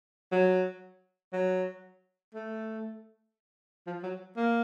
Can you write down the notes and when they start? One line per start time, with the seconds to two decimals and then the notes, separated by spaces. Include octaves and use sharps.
0.32 F#3
1.33 F#3
2.34 A3
3.87 F3
4.03 F#3
4.37 A#3